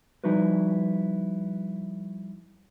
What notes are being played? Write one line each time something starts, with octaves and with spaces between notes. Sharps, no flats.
F3 G3 D#4 E4 F#4 B4